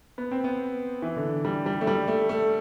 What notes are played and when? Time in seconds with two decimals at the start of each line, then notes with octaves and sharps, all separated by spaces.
0.18 B3
0.31 C4
0.44 B3
1.02 E3
1.16 D3
1.45 G3
1.66 G3
1.81 A3
1.87 G3
2.08 A3
2.29 A3